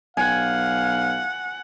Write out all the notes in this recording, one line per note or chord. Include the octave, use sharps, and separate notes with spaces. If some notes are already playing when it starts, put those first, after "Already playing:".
B1 F5 F#5 G#5